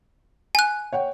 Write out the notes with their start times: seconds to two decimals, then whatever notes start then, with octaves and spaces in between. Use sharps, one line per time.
0.55 G#5 F#6
0.92 C#5 F#5 G5